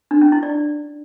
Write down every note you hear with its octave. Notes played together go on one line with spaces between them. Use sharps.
D4
C#4
E4
D5